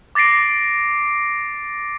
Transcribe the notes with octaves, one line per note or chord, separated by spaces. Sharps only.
D6 A6 A#6 C7 D7